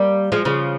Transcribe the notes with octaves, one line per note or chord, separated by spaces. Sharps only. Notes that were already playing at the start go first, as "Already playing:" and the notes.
Already playing: G3 A#3
F3 G#3
C#3 F3